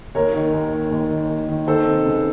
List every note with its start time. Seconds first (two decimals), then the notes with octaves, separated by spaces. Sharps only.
0.15 D#2 A#4 C#5
0.34 D#3
0.53 D#2
0.72 D#3
0.91 D#2
1.11 D#3
1.29 D#2
1.49 D#3
1.67 D#3 A4 C5
1.86 C3
2.06 C#2